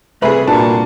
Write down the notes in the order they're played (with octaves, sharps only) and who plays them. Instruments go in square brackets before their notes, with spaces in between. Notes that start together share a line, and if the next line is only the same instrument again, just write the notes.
[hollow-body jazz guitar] C2 B4 B5 [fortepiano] C3 A3 G#4
[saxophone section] A#2 F#4 [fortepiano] D4 [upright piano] A5